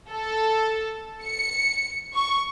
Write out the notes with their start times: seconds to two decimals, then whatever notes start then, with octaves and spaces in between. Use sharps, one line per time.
0.11 A4
1.25 C#7
2.15 C#6